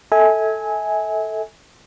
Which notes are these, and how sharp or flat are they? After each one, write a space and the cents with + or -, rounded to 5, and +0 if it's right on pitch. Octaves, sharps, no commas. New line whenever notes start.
A4 +0 E5 -35 G#5 +0